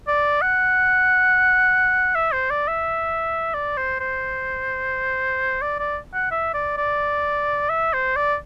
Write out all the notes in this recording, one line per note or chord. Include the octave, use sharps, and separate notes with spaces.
D5
F#5
E5
C5
D5
E5
D5
C5
C5
D5
D5
F#5
E5
D5
D5
E5
C5
D5